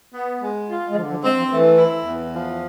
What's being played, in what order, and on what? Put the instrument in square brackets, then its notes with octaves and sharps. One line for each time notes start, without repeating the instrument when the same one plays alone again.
[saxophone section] B3
G#3
F4
[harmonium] G#3
[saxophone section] D3 [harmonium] F3
[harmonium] F3
[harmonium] G#3 [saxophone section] C4
[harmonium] F3
[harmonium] E3 [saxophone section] A3
[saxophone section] E4
E2
F3